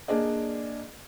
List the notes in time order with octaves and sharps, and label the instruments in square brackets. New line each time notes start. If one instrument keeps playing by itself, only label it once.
[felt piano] A#3 D4 G#4 D5 D#5